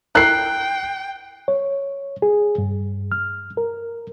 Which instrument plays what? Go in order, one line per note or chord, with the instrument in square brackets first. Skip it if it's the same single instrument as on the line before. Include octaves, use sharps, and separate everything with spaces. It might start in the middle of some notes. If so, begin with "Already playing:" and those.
[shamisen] E4 A4 A#4 [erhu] G5 [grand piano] F#6 C7
[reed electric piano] C#5
G#4
G2
F6
A#4